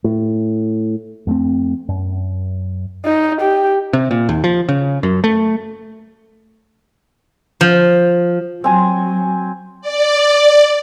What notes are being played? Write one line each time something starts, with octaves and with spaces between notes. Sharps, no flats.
A2
F2 A3 C4
F#2
D#4
G4
C3
A#2
D#2
F3
C#3
F#2
A3
F3
F#3 C4 G#5
D5